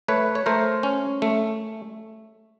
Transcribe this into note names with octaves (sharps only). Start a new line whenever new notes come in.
A3 B4 C#5
C#5
A3 A#4 C5
C#4
A3